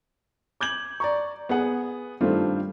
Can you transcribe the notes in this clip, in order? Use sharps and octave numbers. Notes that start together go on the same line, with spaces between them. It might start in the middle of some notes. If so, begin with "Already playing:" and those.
D6 G6 G#6 F#7
D5 A#5 C#6
B3 G#4 F#5
G2 D#3 A3 C4 D4 F4